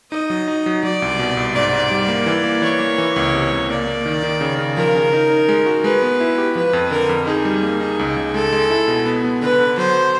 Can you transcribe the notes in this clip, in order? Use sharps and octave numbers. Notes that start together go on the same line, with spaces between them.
D#4 D#5
F#3
D#4
F#3
F#3 D5
C2
B2
C2
G#2 D5
G#2
G3
A#3
E3
A#3
E3 C#5
A#3
E3
C#2
C3
C#2
A#3 D5
A#3
D#3
D#3
C#3
C#3
F3 A#4
C#3
D#4
D#4
G#3
F#4
G#3 B4
B3
E4
G4
F3 B4
F2
D3 A#4
F2
D#4 G#4
G3
A#3
D#4
C#2
C#2
G#3 A4
G#3
E4
B2
B3
B3
D3 B4
D3
F#3 C5